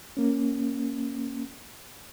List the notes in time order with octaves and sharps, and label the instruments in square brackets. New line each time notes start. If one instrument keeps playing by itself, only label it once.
[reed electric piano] A#3 C#4